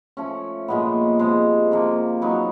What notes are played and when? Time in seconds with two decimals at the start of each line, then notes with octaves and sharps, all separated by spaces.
0.17 F3 A3 C#4
0.68 A#2 F3 G#3 B3
1.19 C3 F3 G#3
1.72 C3 F3 A#3
2.22 F#3 B3 D#4